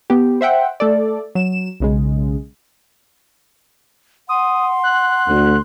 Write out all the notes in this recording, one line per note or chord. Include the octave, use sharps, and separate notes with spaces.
B3 G4
C5 E5 F#5 G5
A3 A4 D5
F#3 E7
B1 C#3 G#3
F#5 C6 D#6
F#6
D2